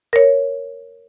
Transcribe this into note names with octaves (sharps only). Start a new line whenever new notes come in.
A#4 C#5